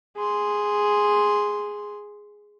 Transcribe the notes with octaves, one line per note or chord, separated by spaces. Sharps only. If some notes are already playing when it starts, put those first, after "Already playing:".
G#4 C6